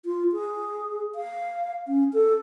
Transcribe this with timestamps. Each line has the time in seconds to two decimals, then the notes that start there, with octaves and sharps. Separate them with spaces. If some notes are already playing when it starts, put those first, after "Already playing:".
0.05 F4
0.33 G#4
1.15 F5
1.88 C#4
2.13 A4